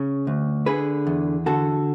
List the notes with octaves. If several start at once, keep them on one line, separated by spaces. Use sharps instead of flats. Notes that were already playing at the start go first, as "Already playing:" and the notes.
Already playing: C#3 C#4
D2
D3 G#4 B4
E2
D3 F#4 A4